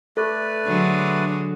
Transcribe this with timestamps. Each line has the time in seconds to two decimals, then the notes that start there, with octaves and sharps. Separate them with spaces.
0.17 A3 A4 B4 D5
0.65 D3 F#3 G#3